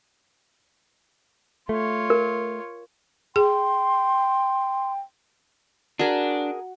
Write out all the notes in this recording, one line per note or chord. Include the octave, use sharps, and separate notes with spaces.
A3 F4 C#5
A#4
G#4 G5 C6
D4 F#4 G#4 A#4